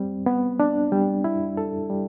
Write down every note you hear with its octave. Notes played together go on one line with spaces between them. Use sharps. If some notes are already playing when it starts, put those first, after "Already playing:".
Already playing: G3 C4
B3
D4
G3
E4
A4
G3